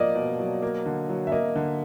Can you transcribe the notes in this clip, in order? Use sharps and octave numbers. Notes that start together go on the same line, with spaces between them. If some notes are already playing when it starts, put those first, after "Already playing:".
Already playing: F3 A#3 D5 D#5
B2
F#3
A#3
D3
F#3
E5
A#3 D#5
D3